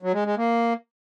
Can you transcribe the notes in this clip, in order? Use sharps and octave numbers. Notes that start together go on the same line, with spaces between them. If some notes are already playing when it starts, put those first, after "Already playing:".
F#3
G#3
G#3
A#3